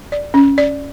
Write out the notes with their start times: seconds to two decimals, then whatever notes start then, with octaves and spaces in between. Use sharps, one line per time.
0.12 D5
0.34 C#4
0.58 D5